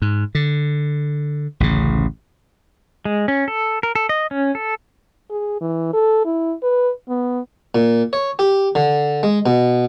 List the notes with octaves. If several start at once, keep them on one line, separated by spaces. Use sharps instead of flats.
G#2
D3
A1 D2 C#3
G#3
C#4
A4
A#4
A4
D#5
C#4
A4
G#4
E3
A4
E4
B4
B3
A#2
C#5
G4
D3
G#3
B2